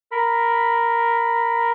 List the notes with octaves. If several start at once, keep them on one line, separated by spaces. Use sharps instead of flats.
A#4 B5